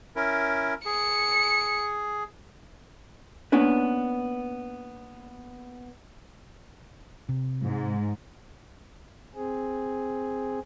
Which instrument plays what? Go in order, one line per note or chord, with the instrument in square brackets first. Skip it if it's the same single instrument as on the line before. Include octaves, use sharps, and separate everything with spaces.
[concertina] C#4 E4 A#4
[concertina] G#4 [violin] C#7
[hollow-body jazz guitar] A#3 B3 C#4 D4 B4
[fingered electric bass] C3
[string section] G#2
[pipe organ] C4 G#4